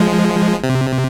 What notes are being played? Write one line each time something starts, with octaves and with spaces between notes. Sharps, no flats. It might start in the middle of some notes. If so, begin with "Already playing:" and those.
Already playing: F3 G#3
C3